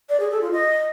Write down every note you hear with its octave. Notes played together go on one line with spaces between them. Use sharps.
D5
G#4
A4
F4
D#5